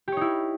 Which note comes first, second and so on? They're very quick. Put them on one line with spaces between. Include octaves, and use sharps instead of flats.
G4 C#5 D#4 E4